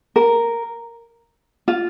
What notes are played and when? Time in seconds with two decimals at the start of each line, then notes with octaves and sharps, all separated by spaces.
0.16 A#4
1.68 F4